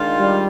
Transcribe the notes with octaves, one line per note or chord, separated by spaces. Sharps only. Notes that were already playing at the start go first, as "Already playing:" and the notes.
Already playing: D#3 G#3 D4 F4
G3